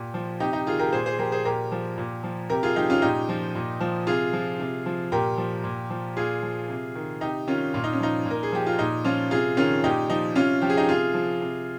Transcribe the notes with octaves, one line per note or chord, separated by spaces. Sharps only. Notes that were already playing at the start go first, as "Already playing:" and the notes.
Already playing: A#2 G4
F3
C3 D#4 G4
D#4 G4
D#3 F4 G#4
G4 A#4
A#2 G#4 C5
G#4 C5
F3 G4 A#4
G#4 C5
A#2 G4 A#4
F3
A#2
F3
C3 G4 A#4
F4 G#4
F3 D#4 G4
C#4 F4
A#2 D#4 G4
F3
A#2
F3
C3 F4 G#4
F3
C3
F3
A#2 G4 A#4
F3
A#2
F3
A#2 F4 G#4
F3
C3
D#3
C3 D#4 G4
D#3 C#4 F4
A#2 F4
D#4
C#4
F3 D#4
A#2 A#4
G#4
F3 G4
F4
A#2 D#4
F3 C#4 F4
C3 F4 G#4
D#3 C#4 F4
A#2 D#4 G4
F3 D#4
C3 C#4 F4
F3 G4
G#4
D#4 G4
C3 F4 G#4
F3
C3